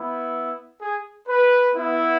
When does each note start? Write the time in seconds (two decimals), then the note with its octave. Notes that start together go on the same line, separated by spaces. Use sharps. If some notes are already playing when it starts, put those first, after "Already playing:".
Already playing: B3 E4
0.81 G#4
1.28 B4
1.74 B3 E4